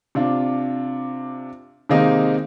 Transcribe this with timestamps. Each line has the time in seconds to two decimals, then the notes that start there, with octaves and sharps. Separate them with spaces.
0.15 C3 D4 F4
1.89 C3 D#3 G#3 A#3 C4 D#4